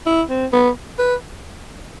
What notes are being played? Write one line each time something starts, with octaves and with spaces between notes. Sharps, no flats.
E4
C4
B3
B4